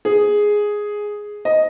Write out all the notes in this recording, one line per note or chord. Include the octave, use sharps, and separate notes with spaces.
G#4
D#5